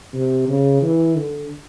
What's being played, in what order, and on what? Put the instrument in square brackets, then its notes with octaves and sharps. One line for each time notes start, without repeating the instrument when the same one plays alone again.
[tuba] C3
C#3
E3
D3